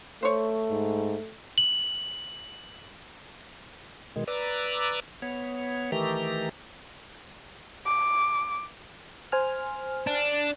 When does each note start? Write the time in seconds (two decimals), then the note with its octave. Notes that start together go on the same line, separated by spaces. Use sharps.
0.23 A3 C5 C#5
0.70 G#2
1.58 F#7
4.16 B2 D#3 G#3
4.28 B4 D5 A#5 D6 E6
5.22 B3 C#5
5.92 D#3 E3 A3 G4 A#5
7.86 D6
9.32 C5 G#5 F6
10.07 D4